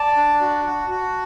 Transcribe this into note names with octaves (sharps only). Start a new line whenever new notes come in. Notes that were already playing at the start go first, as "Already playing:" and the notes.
Already playing: D5 A5
D4
F#4
F#4
F#4